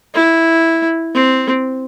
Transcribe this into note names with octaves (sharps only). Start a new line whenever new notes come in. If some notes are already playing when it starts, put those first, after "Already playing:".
E4
C4